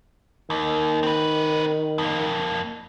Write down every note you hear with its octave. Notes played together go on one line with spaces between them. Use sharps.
D#2 D#3
C4 B4
F2 A#3